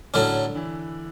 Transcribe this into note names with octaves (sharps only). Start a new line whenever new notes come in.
A2 D3 F#3 C#4 D4
E3 E4